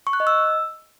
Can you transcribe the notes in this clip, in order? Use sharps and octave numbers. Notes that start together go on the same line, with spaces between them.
C#6
F#6
D#5
E6